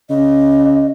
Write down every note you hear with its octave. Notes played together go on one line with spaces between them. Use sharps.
C#3 D#5